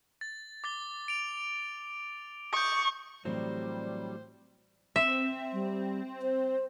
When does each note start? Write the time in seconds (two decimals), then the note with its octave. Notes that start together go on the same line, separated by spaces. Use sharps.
0.21 A6
0.64 D6 A6 G7
1.08 D7 F7
2.53 C#6 D#6 G6
3.25 A2 E3 F#3 G3 C4 C5
4.96 C4 E5
5.53 G3
6.22 C5